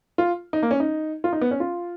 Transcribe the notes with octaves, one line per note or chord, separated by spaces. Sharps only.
F4
D#4
A#3
C#4
D#4
F4
D#4
B3
C#4
F4